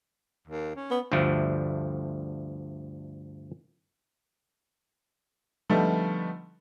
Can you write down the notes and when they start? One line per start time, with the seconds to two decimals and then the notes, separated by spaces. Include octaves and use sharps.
0.47 D#2
0.76 C#4
0.91 B3
1.12 D2 G2 D3 F3 A3
5.69 D3 F3 G3 A3 B3 D#4